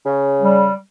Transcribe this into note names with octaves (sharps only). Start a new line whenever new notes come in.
C#3
G3